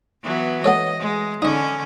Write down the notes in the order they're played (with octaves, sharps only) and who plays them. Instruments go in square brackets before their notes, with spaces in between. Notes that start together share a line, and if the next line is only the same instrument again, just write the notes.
[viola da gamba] E3 F#3 B3
[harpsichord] B3 A4 C#5 [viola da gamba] D#5
[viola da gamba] G#3
[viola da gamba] D3 C#4 [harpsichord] D#4 D#5